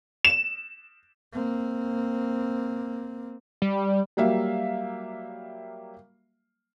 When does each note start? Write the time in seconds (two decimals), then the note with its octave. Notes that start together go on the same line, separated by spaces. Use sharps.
0.25 E7
1.33 A#3 C4
3.62 G3
4.17 F#3 G3 A#3 E5 F5